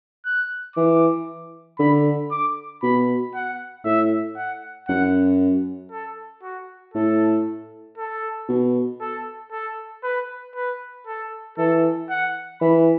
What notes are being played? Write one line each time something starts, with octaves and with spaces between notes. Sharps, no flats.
F#6
E3 D6
D3 B5
D6
B2 B5
F#5
A2 E5
F#5
F#2 F#5
A4
F#4
A2 A4
A4
B2
A4
A4
B4
B4
A4
E3 A4
F#5
E3 B5